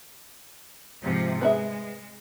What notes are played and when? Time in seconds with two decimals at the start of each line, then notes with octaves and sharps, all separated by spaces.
1.03 G#2 C3 F3
1.41 G#3 B3 G#4 E5